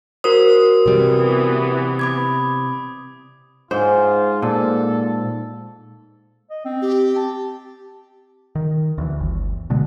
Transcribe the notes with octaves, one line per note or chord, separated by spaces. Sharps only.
F#4 A#4 C5 D#6
C3 E3 G3 B3
B5 D6 G#6
G#2 F4 C5
A#2 A4
D#5
C4
G4
A5
D#3
D2 E3
G1
B2 D3 G#3